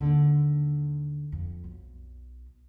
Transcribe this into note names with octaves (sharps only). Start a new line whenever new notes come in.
D#2 D3
F2
B1